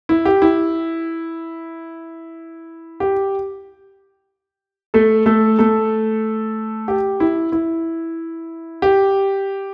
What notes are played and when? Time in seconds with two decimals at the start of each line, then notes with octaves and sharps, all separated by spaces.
0.09 E4
0.25 G4
0.42 E4
3.00 G4
4.94 A3 A4
5.26 A3 A4
5.59 A3 A4
6.88 G4
7.20 E4
7.52 E4
8.82 G4